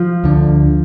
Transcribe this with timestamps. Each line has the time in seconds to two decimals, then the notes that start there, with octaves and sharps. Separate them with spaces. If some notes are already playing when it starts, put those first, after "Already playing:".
Already playing: F3
0.24 D2 D3